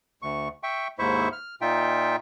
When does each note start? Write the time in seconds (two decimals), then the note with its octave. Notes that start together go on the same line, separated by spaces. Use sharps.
0.22 D2 C#6
0.63 E5 G5 C#6
0.99 D#2 G#2 E4 C5 E5 C#6
1.32 F6
1.61 A#2 D#4 F4 E5 G5